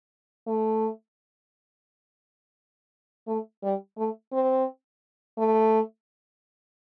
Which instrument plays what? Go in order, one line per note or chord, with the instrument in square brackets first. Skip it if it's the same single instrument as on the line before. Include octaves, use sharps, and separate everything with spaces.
[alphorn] A3
A3
G3
A3
C4
A3